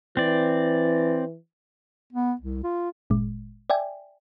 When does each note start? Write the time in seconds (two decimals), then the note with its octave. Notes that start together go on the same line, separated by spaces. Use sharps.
0.17 E3 C4 D5
2.13 B3
2.41 C2
2.64 F4
3.10 G1 A#2 G#3
3.70 D5 E5 G5 G#5